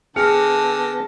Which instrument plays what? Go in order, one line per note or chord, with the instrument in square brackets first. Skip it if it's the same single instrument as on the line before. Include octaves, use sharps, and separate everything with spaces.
[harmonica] D3 G5 [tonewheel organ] B3 A#6 [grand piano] G#4 F6 C#7 [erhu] A5